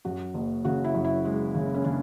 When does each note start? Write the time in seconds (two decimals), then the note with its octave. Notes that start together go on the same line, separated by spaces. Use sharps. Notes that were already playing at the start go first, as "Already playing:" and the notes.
0.05 F#2 F#4
0.34 F#1
0.65 C#3 F#4
0.84 E4
0.95 F#2
1.05 E4
1.25 G#3
1.55 C#3
1.74 C#4
1.84 C#3 D4